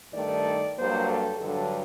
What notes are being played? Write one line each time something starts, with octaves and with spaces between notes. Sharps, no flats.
G2 D#3 A3 D5
G2 F#3 A#3 C5
A4
G2 D3 F#3 A4